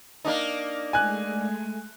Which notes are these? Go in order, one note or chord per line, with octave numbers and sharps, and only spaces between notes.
A#3 D4 D#4
G#3 A3 G#5 F#6